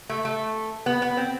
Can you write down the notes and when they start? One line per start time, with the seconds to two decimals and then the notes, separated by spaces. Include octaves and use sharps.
0.09 A3
0.25 A3
0.86 B3
1.02 B3
1.17 C4